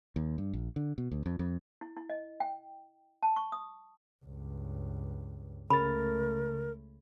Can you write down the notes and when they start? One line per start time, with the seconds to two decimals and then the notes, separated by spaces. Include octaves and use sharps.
0.16 D#2
0.38 G2
0.53 A#1
0.76 D3
0.98 B2
1.12 D2
1.26 F2
1.39 F2
1.81 E4
1.97 E4
2.10 D#5
2.40 G5
3.23 A5
3.36 C#6
3.52 D#6
4.25 C#2 G2
5.70 C#2 C#3 A3 A#4 B5 A6